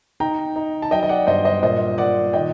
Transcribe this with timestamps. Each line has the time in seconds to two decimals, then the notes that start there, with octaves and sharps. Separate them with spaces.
0.20 D#4 G5 A#5
0.56 D#4
0.82 A5
0.91 F#3 D#5 G5
1.03 D#5
1.09 D5 F#5
1.27 G2 C5 D#5
1.45 C5 D#5
1.63 A#2 C5 D#5
1.98 A#2 D5 F#5
2.33 D#3 D#5 G5